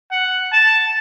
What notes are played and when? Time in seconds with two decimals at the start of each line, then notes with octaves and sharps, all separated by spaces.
0.11 F#5
0.53 A5